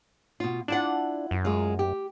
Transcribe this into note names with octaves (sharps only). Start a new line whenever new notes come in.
B2 F4
D4 E4 F4 F#5
F#2
G#3 F4
G4